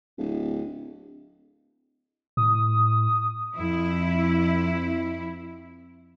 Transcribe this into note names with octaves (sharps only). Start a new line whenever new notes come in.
D1
A2 D#6
F2 E4